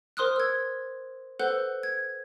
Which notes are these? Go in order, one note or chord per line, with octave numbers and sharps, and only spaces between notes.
A#4 C5 C6 D#6 F6 F#6
E6 G#6
A4 B4 C5 F#5 F#6 G6
G#6